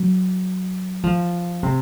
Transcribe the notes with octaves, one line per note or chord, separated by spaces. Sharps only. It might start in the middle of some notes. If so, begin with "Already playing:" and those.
Already playing: F#3
F3
C3